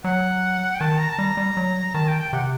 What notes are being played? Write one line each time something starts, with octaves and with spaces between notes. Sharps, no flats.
F#3 F#5
G5
D#3 A5
A#5
A5
G3 A#5
G3
F#3
D#3 A5
G5
G5
C3 F#5